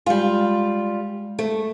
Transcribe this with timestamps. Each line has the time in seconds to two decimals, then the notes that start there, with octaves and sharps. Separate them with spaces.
0.06 G3 G#3 F4
1.39 A3